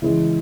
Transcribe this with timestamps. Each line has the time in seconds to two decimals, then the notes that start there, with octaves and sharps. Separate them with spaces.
0.02 C#2 C#3 E3 G#3 E4